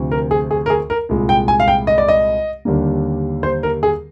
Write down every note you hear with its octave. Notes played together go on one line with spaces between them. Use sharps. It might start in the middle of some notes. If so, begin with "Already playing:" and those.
Already playing: D2 C3 F3
A#4
G#4
G#4
A#4
G#4
A#4
C2 A#2 G#3
G5
G#5
F5
G5
D#5
D5
D#5
D#2 D3 G3 A#3
C5
A#4
G#4